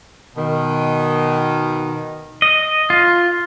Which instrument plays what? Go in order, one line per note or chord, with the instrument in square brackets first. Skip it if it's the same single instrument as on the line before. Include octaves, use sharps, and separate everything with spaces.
[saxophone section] B2 D#3
[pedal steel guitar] D#5
F4